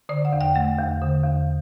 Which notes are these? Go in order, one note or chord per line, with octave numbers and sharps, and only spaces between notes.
D3 D5
F#5
E2
G5
A3 F#5
E2
D3
E2